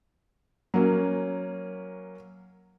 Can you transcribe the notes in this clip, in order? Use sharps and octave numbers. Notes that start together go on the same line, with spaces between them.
F#3 A#3 C#4